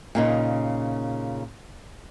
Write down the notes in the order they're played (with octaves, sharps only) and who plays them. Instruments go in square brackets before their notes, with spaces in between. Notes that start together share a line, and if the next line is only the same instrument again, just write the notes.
[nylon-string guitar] A#2 C#3 D#4